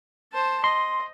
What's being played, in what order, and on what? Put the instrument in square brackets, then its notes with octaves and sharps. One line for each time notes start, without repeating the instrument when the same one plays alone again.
[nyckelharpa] C5 A5
[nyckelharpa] D#5 [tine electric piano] C6